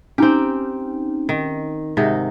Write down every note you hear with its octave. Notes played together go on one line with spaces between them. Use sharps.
C4 C#4 D#4 G4
D#3
G#2 C3 D#4